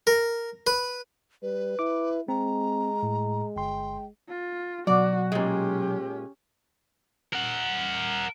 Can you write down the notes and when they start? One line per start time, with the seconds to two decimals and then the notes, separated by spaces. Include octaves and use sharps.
0.07 A#4
0.67 B4
1.42 G3 B4
1.79 E4 D6
2.28 G#3 C4 A#5
3.03 A2
3.56 G1 G5 C6
4.29 F4
4.87 B2 F#3 F#4 D5
5.32 A#2 G#3 C#4 G4
7.33 A#4 F#5